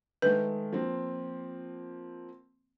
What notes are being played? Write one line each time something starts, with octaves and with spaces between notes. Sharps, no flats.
D#3 G#3 A3 B4
F3 A#3 C4